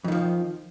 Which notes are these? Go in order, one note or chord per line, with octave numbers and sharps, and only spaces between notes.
F2 D#3 F3